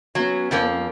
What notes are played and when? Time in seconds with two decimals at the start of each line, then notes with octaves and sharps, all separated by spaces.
0.15 F#3 B3 C#4
0.51 F2 F3 A#3